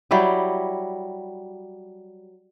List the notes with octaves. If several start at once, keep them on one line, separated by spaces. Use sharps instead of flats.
F#3 G3 E4 G4